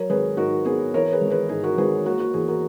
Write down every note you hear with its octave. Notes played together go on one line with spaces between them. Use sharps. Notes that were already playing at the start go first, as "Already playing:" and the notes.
Already playing: F#3 A#4 C#5
G#1 G#4 B4
G#2 F#4 A#4
B3 G#4 B4
E3 A#4 C#5
G#4 B4
G#1
G#4 B4
G#2 G#4
F#4 A#4
G#1 G#4 B4
A#3 F#4 A#4
F#4
E2 G#4
F#4 A#4